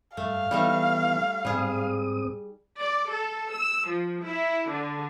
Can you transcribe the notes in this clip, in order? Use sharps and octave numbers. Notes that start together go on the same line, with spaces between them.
G2 A3 F5
E3 G3 A3 B3 D#4
G#2 G3 C4 G#4 D#6
D5
A4
E6
F3
E4
D3